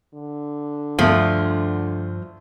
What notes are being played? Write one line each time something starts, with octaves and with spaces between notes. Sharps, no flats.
D3
D2 G2 F3 A3